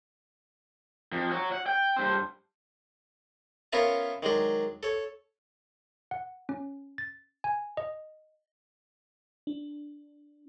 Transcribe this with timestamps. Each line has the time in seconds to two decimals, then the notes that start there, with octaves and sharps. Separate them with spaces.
1.12 F2
1.31 F#4 C#5
1.52 F#5
1.66 G5
1.96 G2 C5
3.73 B3 C#4 F4 A#4 E5 A5
4.23 D#3 F#3 G#3 D4
4.83 A4 C#5
6.11 F#5
6.49 C#4
6.98 A6
7.44 G#5
7.77 D#5
9.47 D4